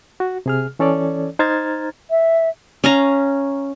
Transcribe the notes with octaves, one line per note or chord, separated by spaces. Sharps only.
F#4
C3 G#4 F6
E3 C#4 A4 C#5 D5
D#4 C5 A#5 F6 G#6 A6
E5
C#4 F5 A#5